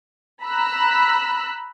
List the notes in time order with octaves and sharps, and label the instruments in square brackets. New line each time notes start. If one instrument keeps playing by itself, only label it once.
[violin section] A#5 B5 E6 F#6